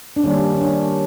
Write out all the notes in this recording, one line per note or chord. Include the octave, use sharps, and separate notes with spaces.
D4
D#3 G3 A#3 C#4
C#4
D4